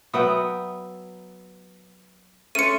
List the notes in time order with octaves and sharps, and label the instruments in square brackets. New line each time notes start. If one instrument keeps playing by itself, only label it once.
[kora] F#3 B3 G5 [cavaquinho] E5 B5 D#6
[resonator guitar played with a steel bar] G#3 A3 C#4 [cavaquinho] C#5 C6 [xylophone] C#7 D#7